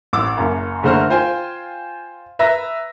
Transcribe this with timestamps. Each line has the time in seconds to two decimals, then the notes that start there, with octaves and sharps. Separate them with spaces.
0.13 A1 D6 E6
0.37 F#1 F#2
0.83 F#1 D3 A3 C5 A#5 F6
1.10 F4 C5 G5 G#5
2.39 B4 E5 A#5 E6 A#6